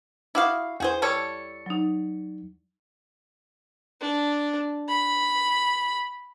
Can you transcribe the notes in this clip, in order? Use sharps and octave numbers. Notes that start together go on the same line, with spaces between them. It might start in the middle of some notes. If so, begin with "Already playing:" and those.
E4 F#4 F5 D6 D#6 F6
E2 F#4 G#4 C5
G3 A4 C#5
F#3 D#4
D4
B5